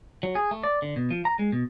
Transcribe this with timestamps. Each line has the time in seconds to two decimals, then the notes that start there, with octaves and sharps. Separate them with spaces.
0.23 F#3
0.35 G#4
0.51 A3
0.63 D5
0.82 D3
0.96 B2
1.11 F3
1.25 A#5
1.39 G#3
1.52 B2